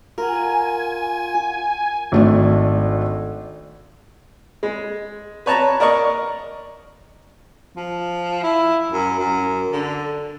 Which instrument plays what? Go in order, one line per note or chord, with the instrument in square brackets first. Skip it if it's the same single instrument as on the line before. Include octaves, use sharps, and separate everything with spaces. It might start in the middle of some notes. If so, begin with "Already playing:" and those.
[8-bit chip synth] F4 [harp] A#4 [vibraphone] F5 F#5 [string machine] G#5
[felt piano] G#1 A3 D4
[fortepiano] G#3
B4 C#5 A5 A#5
A#4 D5 D#5 C#6
[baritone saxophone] F3
E4
F#2
F#2
D3